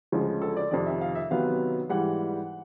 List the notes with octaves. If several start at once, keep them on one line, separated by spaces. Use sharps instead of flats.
D2 C#3 F3 G#3
A4
D5
F2 C3 D#3 D5
E5
F5
E5
C3 D#3 F#3 B3 F5
G#2 E3 G3 F#5